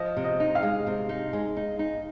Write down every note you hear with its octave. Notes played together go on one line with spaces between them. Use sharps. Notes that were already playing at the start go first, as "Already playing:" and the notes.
Already playing: F3 D#5
C3
D#5
D#4
F5
G#3
C3
D#4
G#3
D#4
D#4